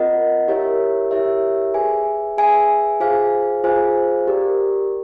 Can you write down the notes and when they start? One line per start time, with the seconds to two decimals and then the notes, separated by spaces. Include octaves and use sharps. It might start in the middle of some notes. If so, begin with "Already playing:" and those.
Already playing: C4 F4 A#4 D#5 F#5
0.48 E4 G4 A#4 C#5 E5
1.11 E4 G4 A#4 C#5 E5
1.74 G#4 B4 E5 G#5
2.37 G#4 B4 E5 G#5
3.00 F4 G#4 C5 F5 G#5
3.64 F4 G#4 C5 F5 G#5
4.27 G4 A#4 D5